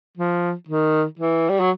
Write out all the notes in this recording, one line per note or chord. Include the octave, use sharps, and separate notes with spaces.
F3
D#3
E3
G3
F#3